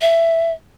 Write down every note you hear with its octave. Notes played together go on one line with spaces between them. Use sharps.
E5